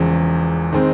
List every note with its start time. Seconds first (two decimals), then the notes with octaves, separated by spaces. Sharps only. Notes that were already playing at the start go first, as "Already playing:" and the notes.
Already playing: E1 E2 C#3 F3
0.73 D#3 G#3 C4